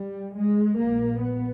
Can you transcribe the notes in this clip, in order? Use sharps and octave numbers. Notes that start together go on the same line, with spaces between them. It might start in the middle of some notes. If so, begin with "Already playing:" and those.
Already playing: G3
G#3
A#1 A#2 A#3
B3